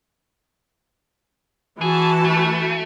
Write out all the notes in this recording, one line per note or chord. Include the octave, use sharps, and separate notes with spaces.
E3 F#4 G#4 A5
A3